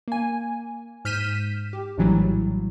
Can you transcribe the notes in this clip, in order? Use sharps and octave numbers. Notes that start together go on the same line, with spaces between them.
A#3 G#5
G#2 F6 G6 B6 D#7 E7
G4
A#1 A2 E3 F#3 G3